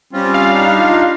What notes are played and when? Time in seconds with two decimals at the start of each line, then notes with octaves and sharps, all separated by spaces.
0.13 G3 C4 C#4 F4
0.34 F5
0.54 D4 D#4
0.78 F4